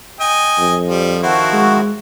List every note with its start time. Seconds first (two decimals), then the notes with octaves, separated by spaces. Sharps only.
0.20 D#5 G5 G#5
0.59 F2
0.88 F3 G3
1.23 D#3 F3 C4 E4 F#4
1.53 G#3